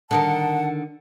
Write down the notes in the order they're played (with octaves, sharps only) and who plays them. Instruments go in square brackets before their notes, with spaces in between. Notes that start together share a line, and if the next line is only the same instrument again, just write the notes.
[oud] D3 D#3 A#4 [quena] F#5 [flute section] A5